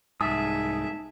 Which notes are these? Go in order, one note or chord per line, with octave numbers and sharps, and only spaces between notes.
C2 G#2 D#4 G#4 E5 A5 D#6